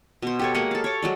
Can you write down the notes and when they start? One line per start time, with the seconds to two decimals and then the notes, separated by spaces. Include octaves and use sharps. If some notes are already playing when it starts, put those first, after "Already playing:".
0.22 B2 C5
0.39 G4 A4 C#5
0.55 G#3 A#3 G4 F#5
0.71 A4 F5
0.84 C#5 D6
1.02 F#3 G#3 D5